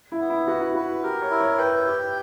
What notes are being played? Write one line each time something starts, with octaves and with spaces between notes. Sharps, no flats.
E4
B3
E4
F#4 B4
E4
F#4 B4
G4 A#4
C#5
E4
C#5
B4 G5
G4